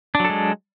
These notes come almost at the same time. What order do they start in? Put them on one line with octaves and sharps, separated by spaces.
D4 F#3 A4 G#3